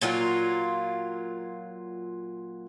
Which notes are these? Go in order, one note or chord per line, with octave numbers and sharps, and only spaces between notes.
A#2 F#3 F4 A#4